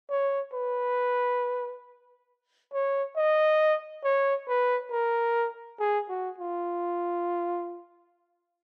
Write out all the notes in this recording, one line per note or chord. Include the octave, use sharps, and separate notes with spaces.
C#5
B4
C#5
D#5
C#5
B4
A#4
G#4
F#4
F4